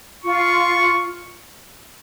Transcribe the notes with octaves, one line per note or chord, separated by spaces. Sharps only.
F4 C#6